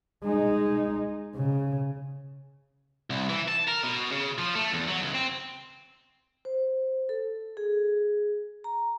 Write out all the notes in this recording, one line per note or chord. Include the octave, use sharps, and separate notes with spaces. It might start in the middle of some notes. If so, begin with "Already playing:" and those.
G#3 D#4
C#3
C2
E3
A5
A#4
B2
C#3
F3
A3
E2
F#3
C#2
C4
C5
A4
G#4
A#5